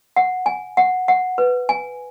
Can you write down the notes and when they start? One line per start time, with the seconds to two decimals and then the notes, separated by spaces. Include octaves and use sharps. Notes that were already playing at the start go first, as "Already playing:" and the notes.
0.16 F#5
0.46 G#5
0.77 F#5
1.08 F#5
1.38 B4
1.69 G#5